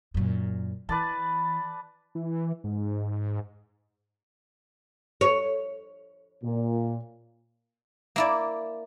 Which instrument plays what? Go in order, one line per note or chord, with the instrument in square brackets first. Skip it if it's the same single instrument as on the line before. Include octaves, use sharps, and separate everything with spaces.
[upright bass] F#2 A#2
[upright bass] E3 [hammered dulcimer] B4 D5 A5
[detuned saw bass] E3
G#2
[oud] C#5
[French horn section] A#2
[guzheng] A#3 E4 D5